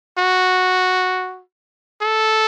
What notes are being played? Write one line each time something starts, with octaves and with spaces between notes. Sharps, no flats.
F#4
A4